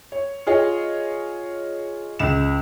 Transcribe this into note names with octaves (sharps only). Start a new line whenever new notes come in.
C#5
F4 G#4 C#5 D#5
C#2 E7